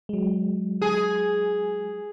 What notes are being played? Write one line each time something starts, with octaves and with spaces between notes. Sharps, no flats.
F#3 G#3
G#4